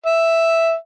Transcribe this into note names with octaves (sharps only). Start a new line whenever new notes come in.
E5